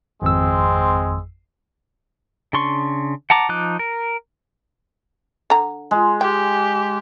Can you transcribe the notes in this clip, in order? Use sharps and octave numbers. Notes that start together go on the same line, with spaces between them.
G#1 F2 G#3 C4 E6
C#3 D4 C6 C#6
F#5 A5 A#5 D6
F3 D#4 D6 F#6
A#4
D3 A#5
G#3
G4 G5